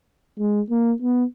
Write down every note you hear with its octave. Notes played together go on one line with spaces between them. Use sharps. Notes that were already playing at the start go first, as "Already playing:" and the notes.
G#3
A#3
B3